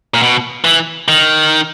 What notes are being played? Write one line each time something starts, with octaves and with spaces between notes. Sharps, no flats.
A#2
B2
E3
D#3